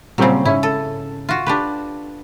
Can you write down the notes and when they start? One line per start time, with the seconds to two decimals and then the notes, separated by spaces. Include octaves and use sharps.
0.18 A#2 C#3 F#3 G3 C4
0.45 G#2 C#4 E4
0.63 A4
1.29 F4 F#4
1.47 D4 G4 B4